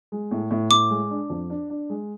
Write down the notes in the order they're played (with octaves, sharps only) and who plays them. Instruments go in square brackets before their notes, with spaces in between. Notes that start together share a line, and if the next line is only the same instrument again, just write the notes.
[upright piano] G#3
A2
A2
[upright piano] A2 [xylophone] D6
[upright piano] G#3
D4
F2
D4
D4
G#3